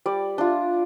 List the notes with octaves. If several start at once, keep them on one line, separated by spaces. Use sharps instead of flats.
G3 D5
D4 F4